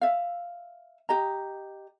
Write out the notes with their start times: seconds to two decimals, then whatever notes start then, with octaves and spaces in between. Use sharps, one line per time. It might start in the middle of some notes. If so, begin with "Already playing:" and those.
0.01 E5 F5
1.09 G4 D#5 A#5